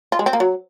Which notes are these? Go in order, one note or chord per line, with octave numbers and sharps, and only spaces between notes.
F4
G#3
C4
A#3
F#3